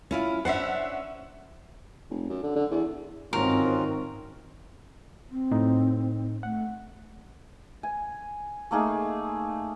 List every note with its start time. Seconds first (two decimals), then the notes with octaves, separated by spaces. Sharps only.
0.11 C#4 E4 F4
0.45 C#4 D4 C5 E5 F#5
2.10 F1
2.29 F#2
2.43 D3
2.56 D3
2.70 E2
3.33 G1 G#2 D#3 C4 C#4 F4 F#4 A#4
5.31 C4
5.51 A2 D#4
6.43 A3 F#5
7.83 G#5
8.71 A3 A#3 D#4 G#4